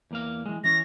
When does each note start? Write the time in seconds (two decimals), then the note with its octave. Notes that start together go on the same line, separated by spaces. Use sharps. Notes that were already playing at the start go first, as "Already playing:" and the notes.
0.11 E2 A#3 F5
0.46 E3 G#3
0.64 E3 C#4 A#6